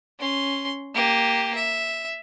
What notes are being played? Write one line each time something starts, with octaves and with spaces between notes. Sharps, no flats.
C#4 C6
A#3 G4
E5